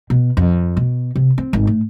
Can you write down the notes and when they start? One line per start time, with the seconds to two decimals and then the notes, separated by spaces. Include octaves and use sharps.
0.10 B2
0.37 F2
0.77 B2
1.16 C3
1.38 C4
1.53 G#1
1.67 A2